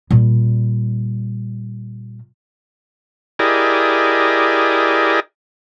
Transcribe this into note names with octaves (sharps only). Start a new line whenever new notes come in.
A#2 G3
E4 G4 G#4 A#4 D5 D#5